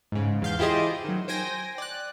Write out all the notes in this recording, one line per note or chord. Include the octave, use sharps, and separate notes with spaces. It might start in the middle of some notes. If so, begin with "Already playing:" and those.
G#2 C#3
E2 F5 G6
E4 F4 G4 G#4 C5 D#5
D#3 F#3
C5 G5 G#5 A#6
D5 F#6